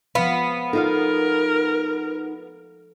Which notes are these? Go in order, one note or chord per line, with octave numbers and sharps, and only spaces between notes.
F3 G#3 B3 F5
D#4 F4 A4 A#4 F5